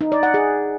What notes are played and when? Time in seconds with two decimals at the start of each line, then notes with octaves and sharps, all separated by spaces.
0.01 D#4
0.12 D5
0.23 F#5
0.34 G#4